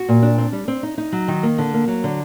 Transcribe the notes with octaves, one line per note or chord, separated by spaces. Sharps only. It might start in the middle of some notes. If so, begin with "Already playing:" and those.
Already playing: F#4
A#2
D4
C4
G3
C4
D#4
D#4
F#3
D#3
A#3
D3
A#3
F#3
D3